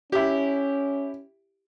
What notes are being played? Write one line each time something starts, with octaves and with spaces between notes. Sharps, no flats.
C#4 E4 G4